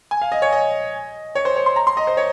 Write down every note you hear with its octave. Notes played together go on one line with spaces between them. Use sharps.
G#5
F5
D#5
C#5
D#5
C#5
C5
C#5
C6
A#5
C6
D#5
C5
C#5